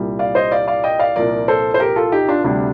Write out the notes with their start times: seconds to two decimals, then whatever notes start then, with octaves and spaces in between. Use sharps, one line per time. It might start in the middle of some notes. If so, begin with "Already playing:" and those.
Already playing: C2 A#2 G3
0.19 D5 F5
0.35 C5 D#5
0.51 D5 F5
0.68 D5 F5
0.84 D#5 G5
0.99 D5 F5
1.16 C2 A#2 F3 A#4 D5
1.48 A4 C5
1.74 C5
1.80 G4 A#4
1.96 F4 A4
2.12 D#4 G4
2.28 D4 F4
2.44 D2 C3 G3 D4